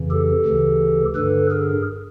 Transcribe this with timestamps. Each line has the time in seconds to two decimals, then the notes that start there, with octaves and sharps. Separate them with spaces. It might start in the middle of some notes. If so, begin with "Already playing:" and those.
Already playing: F2 C#3 E3
0.11 G4 A4
0.46 D2 C#3 E3
1.15 G2 D3 A4 B4
1.50 G#4 A#4